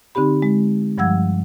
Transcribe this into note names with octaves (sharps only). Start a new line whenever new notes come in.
D3 C4 D#4 G4 B5
G#3
G2 F3 G3 F#5 E6 G#6